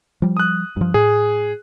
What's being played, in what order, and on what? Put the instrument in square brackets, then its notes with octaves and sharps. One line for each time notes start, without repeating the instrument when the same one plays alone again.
[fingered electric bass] F3 G3
[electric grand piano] D#6 F#6
[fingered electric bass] G2 F3
[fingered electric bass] A2 [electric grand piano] G#4